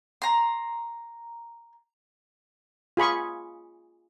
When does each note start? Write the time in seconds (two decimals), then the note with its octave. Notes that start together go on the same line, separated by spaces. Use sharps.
0.22 A#5 C6
2.97 F4 G#4 B5 C#6